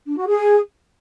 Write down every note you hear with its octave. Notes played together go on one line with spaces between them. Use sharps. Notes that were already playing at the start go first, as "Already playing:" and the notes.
D4
F#4
G#4